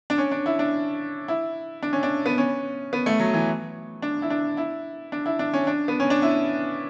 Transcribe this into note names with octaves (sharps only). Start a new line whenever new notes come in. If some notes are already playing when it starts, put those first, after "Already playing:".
D4
C#4
D4
E4
D4
E4
D4
C#4
D4
B3
C#4
B3
A3
F#3
E3
D4
E4
D4
E4
D4
E4
D4
C#4
D4
B3
C#4
D4
E4